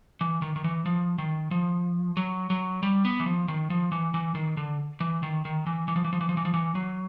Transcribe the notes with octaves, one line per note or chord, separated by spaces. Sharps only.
E3
D#3
D#3
E3
F3
D#3
F3
F#3
F#3
G3
B3
E3
F3
D#3
F3
E3
E3
D#3
D3
E3
D#3
D#3
E3
E3
F3
E3
F3
E3
F3
E3
F3
E3
F#3